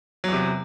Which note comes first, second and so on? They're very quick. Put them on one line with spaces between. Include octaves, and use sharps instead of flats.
F#3 E2 C3